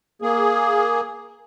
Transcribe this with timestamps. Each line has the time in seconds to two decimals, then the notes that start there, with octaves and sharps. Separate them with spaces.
0.22 A#3 G#4